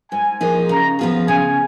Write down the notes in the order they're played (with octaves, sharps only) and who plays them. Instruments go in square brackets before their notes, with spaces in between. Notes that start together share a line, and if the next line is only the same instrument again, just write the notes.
[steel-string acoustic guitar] G#2 [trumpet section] G#5
[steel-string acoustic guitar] F3 A#3 D#4 G#4
[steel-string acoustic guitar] C#3 [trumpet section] A#5
[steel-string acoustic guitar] F3 B3 F4 G#4
[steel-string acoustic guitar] C#3 [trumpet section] G#5